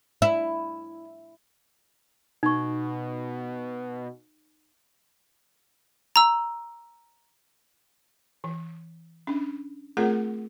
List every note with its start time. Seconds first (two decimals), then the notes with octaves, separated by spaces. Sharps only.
0.22 E4
2.43 B2 D#4 C#6
6.16 A#5 E6
8.44 E3
9.27 C#4 D4
9.97 A3 C4 F4 G#4 A#4 F#5